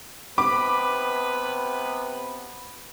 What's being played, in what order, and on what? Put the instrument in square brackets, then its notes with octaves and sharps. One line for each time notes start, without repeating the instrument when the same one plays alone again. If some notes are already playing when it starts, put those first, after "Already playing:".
[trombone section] C3 B3 [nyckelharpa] B4 [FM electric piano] B5 [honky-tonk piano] D6